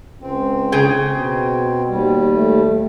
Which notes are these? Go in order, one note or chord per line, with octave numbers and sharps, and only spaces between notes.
C#2 C4
C#3 G#4 G5
B2
D#2 G3
A3